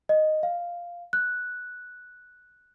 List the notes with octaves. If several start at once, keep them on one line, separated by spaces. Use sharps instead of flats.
D#5
F5
F#6